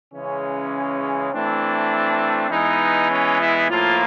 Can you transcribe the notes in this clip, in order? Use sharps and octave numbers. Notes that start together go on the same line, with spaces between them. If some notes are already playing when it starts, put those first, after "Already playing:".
C#3 E3 G#3 C#4
E3 A3 C4 D4
E3 G#3 B3 D#4
C#4
E4
A2 F3 A#3 F4